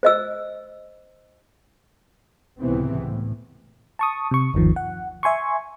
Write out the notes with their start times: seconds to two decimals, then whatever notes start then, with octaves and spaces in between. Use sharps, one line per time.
0.03 C5 D#5 E6
2.59 C#2 A2 C3 E3 B3 C4
3.02 A2
3.99 A5 C#6 D#6
4.31 C3 C#6
4.54 G1 D#2 D#3 F3
4.76 F#5
5.23 E5 G#5 C6 C#6